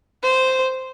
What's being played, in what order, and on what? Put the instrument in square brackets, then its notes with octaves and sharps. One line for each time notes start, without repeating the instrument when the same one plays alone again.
[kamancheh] C5